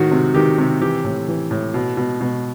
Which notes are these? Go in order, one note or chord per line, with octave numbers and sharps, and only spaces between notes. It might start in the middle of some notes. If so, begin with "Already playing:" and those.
Already playing: A2 D#3 F#4
C3
D#3 G4
C3
E3 G4
A2
E3
A2
B2
B2
B2